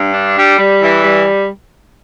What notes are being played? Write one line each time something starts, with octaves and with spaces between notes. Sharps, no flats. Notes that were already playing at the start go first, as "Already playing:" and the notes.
Already playing: G2
D4
G3
G3
E3
G3